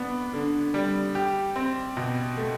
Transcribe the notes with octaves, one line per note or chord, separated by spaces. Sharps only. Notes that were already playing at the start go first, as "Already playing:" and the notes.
Already playing: B3 D4
D3
G3
G4
C4
B2
A3